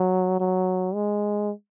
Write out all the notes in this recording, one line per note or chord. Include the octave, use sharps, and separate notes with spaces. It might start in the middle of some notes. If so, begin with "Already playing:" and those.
Already playing: F#3
F#3
G#3